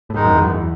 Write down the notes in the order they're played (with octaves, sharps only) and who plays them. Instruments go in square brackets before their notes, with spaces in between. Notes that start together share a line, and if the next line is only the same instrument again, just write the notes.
[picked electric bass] A2
[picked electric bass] G#2 [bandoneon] D#3 G#3 D#4
[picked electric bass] F#2
E2
F#2
E2